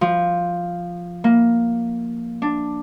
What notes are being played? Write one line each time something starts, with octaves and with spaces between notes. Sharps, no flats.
F3
A#3
D4